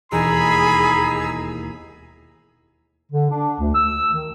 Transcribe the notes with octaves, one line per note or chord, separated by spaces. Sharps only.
E1 D#2 D#4 G#4 A#5 B5 E6
D3
D4
D2
E6
D#3